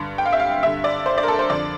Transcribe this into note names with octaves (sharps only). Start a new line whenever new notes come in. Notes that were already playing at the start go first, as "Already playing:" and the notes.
Already playing: G2 D3
G5
F5
E5
F5
G2 D3 E5
D5
C5
D5
A#4
A4
C5
F2 D3 D5